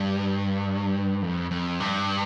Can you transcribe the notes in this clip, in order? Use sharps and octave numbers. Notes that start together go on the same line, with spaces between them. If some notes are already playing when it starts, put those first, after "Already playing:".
Already playing: G2
F2
F2
G2